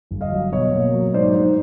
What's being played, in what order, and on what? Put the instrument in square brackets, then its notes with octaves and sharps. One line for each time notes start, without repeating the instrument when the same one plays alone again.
[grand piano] G1
D#5 F5
F#3
B2 C#5 D#5
A#3
F#3
G#2 C5 D5
G#2